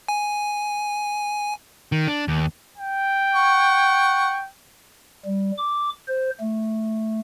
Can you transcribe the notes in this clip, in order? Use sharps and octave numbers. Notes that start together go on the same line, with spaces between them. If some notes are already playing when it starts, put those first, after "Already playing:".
G#5
D#3
D4
D#2
G5
F#5 C#6
G3
D6
C5
A3